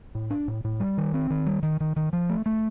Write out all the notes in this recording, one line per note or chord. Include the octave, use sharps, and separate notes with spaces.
A2
D4
A2
A2
G3
D#3
C4
D#3
G3
D#3
D#3
D#3
F3
A3
A3